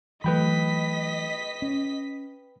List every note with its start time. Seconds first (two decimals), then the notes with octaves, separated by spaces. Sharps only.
0.24 E3 F#3 A3 B4 D#5 G5 B5 B6
1.62 C#4